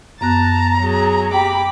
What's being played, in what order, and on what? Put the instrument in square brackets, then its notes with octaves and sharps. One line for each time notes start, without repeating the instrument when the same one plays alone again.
[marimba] F#2 B3 F#6 [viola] A5 [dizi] A#5
[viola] F#3 G#4
[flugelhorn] G4 [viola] B5 D6